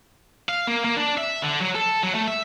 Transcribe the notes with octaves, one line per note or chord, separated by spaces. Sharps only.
F5
A#3
A#3
D4
E5
D3
F#3
A4
F#3
A3
E5